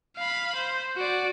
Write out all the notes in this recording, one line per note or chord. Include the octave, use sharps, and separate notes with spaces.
F5 B5
C5
F#4 D5